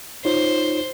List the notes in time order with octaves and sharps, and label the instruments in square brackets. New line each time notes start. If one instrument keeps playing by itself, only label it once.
[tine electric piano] D#4 F4 C#5 [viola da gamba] C5